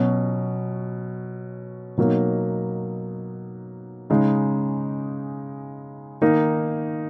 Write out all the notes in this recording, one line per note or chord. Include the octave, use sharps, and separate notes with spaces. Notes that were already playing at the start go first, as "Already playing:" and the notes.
Already playing: B2 F#3 C#4
B2 F#3 A#3 D#4
C#3 G#3 D#4
D#3 A#3 D#4